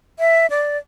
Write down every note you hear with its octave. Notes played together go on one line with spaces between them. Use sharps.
E5
D5